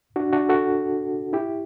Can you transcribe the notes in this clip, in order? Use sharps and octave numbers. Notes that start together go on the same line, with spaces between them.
D4 F#4
D4 F#4
F#4 A4
E4 G4